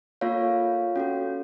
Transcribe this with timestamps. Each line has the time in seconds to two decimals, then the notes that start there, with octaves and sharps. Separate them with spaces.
0.21 A#3 F4 A4 C#5 F5
0.96 C#4 F#4 A4